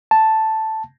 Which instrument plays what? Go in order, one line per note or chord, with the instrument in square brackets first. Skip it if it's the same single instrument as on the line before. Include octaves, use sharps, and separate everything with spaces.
[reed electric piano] A5